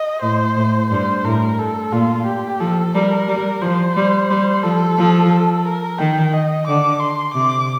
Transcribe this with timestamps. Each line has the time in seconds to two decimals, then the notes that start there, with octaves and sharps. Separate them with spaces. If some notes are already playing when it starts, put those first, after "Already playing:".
Already playing: D#5
0.22 A2 C5
0.56 A2
0.90 G2 C5
1.24 A2 A#4
1.59 A4
1.92 A#2 F4
2.26 G4
2.60 F3 A4
2.94 G3 A#4
3.28 G3
3.61 F3 C5
3.96 G3
4.30 G3
4.63 F3 A4
4.98 F3
5.31 A4
5.65 A#4
5.99 D#3 G5
6.33 D#5
6.67 D3 D6
7.00 C6
7.34 C3 D6